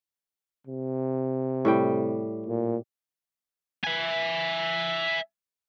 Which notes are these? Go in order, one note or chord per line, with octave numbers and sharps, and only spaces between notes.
C3
A2 G3 G5
A#2
E5 G#5